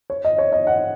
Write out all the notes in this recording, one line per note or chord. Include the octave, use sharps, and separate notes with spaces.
C#5
D#5
C#5
D#5
F#5